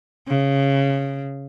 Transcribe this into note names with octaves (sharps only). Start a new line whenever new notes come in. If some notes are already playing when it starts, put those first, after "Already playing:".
C#3